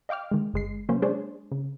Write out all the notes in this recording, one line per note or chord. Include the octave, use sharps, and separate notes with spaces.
D#5 F5 G5 D6 F6
D#3 G#3
G1 G#3 C7
C3 F#3 A#3 B3 C#4 C5
G#3 D4 G#4 C5 C#5
C#3